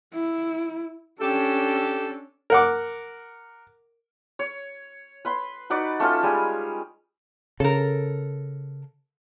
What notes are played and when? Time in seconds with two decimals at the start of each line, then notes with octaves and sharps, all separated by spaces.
0.14 E4
1.21 C#4 D4 G4 A4
2.50 A#4 F#5 D6
4.39 C#5
5.25 B4 B5 C6
5.70 D#4 F#4 B4 D5
6.00 A3 C#4 F4 A4
6.23 G3 G#3 G#5
7.60 C#3 A4 A#4